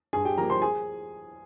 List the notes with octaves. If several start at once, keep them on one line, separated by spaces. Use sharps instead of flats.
G2 G#4 G#5
G4 G5
F3 A#3 A#4 A#5
C5 C6
G#4 G#5